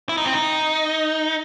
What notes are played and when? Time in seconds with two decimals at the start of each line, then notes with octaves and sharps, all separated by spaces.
0.09 E4
0.17 D#4
0.26 C4
0.33 D#4